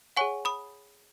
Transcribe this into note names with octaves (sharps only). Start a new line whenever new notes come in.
G#4 C#5 F#5 G#5 C#6
B5 D#6